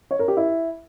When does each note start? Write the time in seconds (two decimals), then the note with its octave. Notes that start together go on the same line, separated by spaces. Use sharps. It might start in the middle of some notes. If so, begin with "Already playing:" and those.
0.11 C#5
0.19 A#4
0.28 G4
0.37 E4